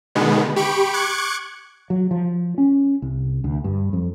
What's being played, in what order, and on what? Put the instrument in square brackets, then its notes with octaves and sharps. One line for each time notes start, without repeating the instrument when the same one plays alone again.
[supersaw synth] B2 D3 D#3 G#3 B3
G4 B5 C#6 D7
C#6 D6 F#6 G#6 C#7
[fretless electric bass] F#3
F3
C#4
C2
D2
G2
F2